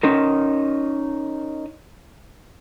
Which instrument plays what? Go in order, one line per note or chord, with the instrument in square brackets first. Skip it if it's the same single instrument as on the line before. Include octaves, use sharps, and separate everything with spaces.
[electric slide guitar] C#4 D#4 A#4